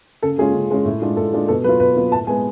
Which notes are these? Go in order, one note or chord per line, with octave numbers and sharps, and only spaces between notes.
C#3 A4
G#3 C#4 F4 G#4
C#3
G#3 C#4 F4
A2
G#3 D4 F4
A2 A4
G#3 D4 F4
B2 A4
F#3 B3 F4 B4
B2 B4
F#3 B3 F4
A2 A5
G#3 B3 G#5